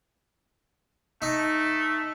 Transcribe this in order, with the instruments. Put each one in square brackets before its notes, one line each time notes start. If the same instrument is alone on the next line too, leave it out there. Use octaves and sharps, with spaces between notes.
[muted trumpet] A3 [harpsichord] D#4